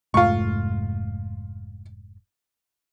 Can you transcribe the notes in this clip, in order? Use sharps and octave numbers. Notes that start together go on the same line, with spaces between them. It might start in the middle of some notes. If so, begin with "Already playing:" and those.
F1 G#2 A3 F4 C#6